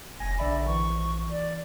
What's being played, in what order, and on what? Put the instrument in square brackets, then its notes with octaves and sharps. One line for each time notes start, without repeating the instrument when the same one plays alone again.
[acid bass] F1 [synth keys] G#5 [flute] A#6
[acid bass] A#1 [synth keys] D3 E5 B5 [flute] D5
[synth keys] E3 [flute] C#6
[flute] D5